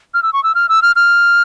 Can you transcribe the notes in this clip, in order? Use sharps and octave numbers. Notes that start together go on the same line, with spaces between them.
F6
E6
C#6
E6
F6
E6
F6
F6